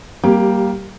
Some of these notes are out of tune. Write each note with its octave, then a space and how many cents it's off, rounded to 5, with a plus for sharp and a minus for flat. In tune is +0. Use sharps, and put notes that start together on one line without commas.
G3 -25 A#3 +0 G4 +0